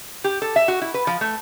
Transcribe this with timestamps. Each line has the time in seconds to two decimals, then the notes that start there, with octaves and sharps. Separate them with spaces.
0.24 G4
0.42 A4
0.56 E5
0.68 F#4
0.82 E4
0.94 B4
1.07 F3
1.21 A3